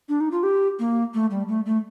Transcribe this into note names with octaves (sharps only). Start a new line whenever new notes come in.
D4
D#4
F4
G4
A#3
A3
G3
A3
A3